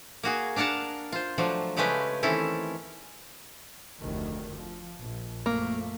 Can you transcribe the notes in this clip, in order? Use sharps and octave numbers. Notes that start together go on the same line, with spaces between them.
A#3 F#4 G#4
D4 A#4 F5 F#5 A5
F4 C5
F3 F#3 A3 D4
C#3 G#3 A3 C#4 G4 B4
D#3 E3 C4 C#4 E4 A4
F1 D2 D#3
F3
A#1
F#2 F3 A3 A#3